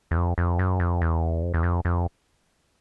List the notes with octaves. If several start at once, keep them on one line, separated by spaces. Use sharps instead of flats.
E2
F2
F2
F#2
F2
E2
F2
E2
F2
F2